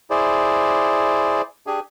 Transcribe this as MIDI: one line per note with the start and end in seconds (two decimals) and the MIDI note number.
0.10 1.41 64
0.10 1.41 68
0.10 1.41 72
0.10 1.41 74
1.67 1.80 62
1.67 1.80 67
1.67 1.80 68
1.67 1.80 80